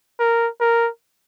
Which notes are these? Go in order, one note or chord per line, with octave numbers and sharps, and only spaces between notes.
A#4
A#4